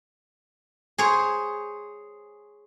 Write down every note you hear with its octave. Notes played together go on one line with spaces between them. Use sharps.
G#4 C5 C#5